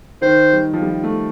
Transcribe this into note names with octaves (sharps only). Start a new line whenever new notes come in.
D#3 C5
G3
F3
G3
A3